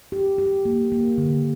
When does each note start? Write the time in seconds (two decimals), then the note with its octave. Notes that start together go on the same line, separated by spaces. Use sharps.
0.12 G4
0.38 G4
0.65 A#3
0.92 A#3
1.18 D3